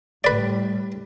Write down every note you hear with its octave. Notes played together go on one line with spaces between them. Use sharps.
A2 G3 B4 D5